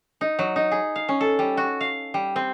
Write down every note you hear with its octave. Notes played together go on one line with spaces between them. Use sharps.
D#4
F#3
D#4
G#4
F5
C#4
A4
G3
F#4
F5
G3
C4